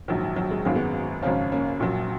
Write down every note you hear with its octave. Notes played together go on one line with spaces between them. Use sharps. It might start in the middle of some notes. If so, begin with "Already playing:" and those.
A#1 G#2 D#3 F#3
F#3
G#3
G#1 F#2 D#3 F#3 A#3
G#3 B3
G#1 F#2 C#3 F3 C#4 F4
A#3 C#4
A#1 A#2 F#3